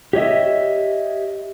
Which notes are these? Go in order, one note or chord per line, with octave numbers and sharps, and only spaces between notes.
G4 C#5 D#5 E5